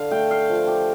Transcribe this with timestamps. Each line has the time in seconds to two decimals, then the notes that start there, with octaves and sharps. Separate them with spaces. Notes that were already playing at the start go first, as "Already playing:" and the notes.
Already playing: D3 F5
0.11 A3 G5
0.31 F5
0.50 F3
0.67 G4